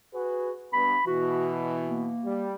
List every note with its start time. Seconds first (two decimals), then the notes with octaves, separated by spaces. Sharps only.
0.14 F#4 G#4 B4
0.73 G2 B3 B5
1.07 B2 E3 F#4
1.86 A#3
2.24 G3